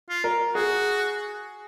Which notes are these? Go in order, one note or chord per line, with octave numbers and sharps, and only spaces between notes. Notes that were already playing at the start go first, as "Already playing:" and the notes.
F4
A#4
F#4 G#4